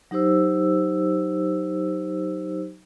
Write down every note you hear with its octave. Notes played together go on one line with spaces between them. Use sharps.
F#3 D#4 G4 C5 E6